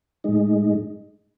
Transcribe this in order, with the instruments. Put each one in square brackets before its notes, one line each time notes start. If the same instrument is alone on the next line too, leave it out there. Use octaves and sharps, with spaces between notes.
[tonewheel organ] A2 G#3 D#4